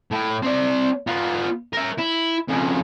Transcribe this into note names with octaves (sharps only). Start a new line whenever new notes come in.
A2
C4 D5
B3 F4
A#4 E5
E4
F2 C#3